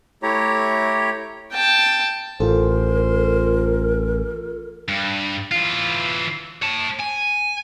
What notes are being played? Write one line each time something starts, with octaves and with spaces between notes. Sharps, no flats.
A3 E4 G4 C#5 A#5
G5 A5
A1 F4 A4 A#4 C5
G2
E3 F4
C#5 A5
G#5